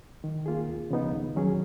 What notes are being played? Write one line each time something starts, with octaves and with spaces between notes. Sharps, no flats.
D#3
A#3 F4 G#4
D#2
C#3 F3 B3 D#4
D#2
D#3 F#3 C#4 G#4